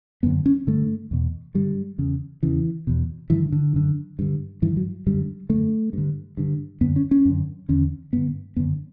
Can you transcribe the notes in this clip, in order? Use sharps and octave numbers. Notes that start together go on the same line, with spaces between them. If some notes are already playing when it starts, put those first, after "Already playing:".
F#2 D3 B3
C#4
G2 D3 A3
E2 B2
G2 D3 G3
E2 C#3
E2 C#3 E3
E2 B2
G2 D3 E3
D3
F#2 D3
G2 D3
G2 D3 E3
F#3
F#2 D3 G3
F#2 D3 A3
G2 D3
G2 D3
F#2 D3 B3
C#4
C#4
F#2 D3
E2 D3 C#4
G2 D3 B3
F#2 D3 B3